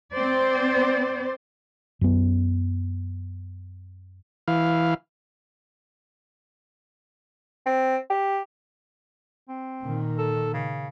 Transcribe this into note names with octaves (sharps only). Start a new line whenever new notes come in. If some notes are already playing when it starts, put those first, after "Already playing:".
C4 C5 D5
F#2 B3
E3 F5
C4
G4
C4
A#2 D#3
A4
C#3